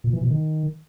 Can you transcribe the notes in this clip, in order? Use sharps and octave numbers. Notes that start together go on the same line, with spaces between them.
A#2
E3
B2
D#3